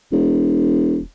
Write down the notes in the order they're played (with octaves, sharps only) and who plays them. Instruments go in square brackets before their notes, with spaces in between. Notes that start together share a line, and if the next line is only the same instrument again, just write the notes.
[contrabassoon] E1